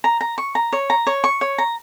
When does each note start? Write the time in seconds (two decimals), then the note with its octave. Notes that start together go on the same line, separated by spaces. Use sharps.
0.04 A#5
0.21 A#5
0.38 C#6
0.55 A#5
0.73 C#5
0.90 A#5
1.07 C#5
1.24 C#6
1.41 C#5
1.58 A#5